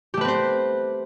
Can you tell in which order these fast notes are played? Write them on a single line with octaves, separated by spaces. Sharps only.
G4 A3 B4 C4 C5